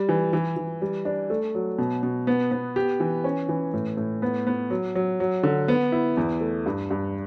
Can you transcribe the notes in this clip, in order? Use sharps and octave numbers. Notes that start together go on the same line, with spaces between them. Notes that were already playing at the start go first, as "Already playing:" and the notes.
Already playing: G3
E3
E3
E3
G3
D4
A3
F#3
B2
B2
B3
B3
G4
E3
C#4
E3
A2
A2
B3
B3
F#3
F#3
F#3
D3
B3
E4
E2
A3
G2
G2